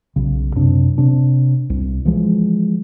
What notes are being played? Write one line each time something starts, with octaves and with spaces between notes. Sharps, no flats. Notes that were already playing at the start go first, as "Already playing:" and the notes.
B1 C#3
F#2 C3 D4
C3 D4
C2
E3 F3 G#3